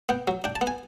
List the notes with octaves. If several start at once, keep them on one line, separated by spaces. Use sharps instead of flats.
B3 G5
F#3
D4 G5
A5
B3
G#5